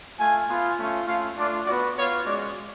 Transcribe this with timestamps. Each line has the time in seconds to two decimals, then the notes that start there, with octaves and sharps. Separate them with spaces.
0.18 A3 F4 G#5
0.48 B3 F4
0.77 A3 C#4 F4
1.07 A3 C#4 F4 F5
1.36 A3 D4 F4 D5
1.66 B3 F#4 D5
1.95 B3 F4 C#5
2.25 G#3 C#4 F#4 D5